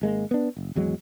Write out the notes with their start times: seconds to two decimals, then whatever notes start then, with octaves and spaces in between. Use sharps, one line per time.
0.02 G#1 G#3 A#3
0.31 B3 D4
0.57 F#1
0.75 G#1 E2 F#3 G#3